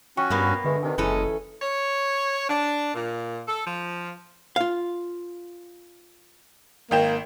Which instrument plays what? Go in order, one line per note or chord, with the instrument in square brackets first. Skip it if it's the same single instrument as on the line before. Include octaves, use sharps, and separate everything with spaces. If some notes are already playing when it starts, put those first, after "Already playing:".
[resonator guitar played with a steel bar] F3 [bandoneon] C#4 F#4 [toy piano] G5 C#6
[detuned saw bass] G2 [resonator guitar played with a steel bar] B2 A#3 B3
[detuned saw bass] D3 [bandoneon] G#3 [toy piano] G4 B4 E5
[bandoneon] C3 D#3 [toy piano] A4 G#5
[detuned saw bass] F#1 [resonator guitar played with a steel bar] E3 C#4 A4 [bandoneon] G#3 D#5 [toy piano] E4
[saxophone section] C#5
D4
A#2
A4
F3
[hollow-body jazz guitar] F4 F5
[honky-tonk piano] G#1 G5 E7 [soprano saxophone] A#3